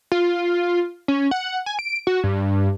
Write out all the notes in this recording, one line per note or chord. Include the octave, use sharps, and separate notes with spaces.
F4
C#4
F#5
G#5
D7
F#4
G2